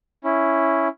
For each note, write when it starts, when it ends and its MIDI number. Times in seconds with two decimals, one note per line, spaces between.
0.24 0.88 61
0.24 0.88 64